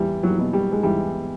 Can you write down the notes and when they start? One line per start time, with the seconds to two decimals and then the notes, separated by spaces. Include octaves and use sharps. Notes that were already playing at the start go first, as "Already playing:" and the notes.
Already playing: E2 G3
0.23 F#3
0.38 B2 F#3
0.53 G3
0.72 G#3
0.83 E2 G3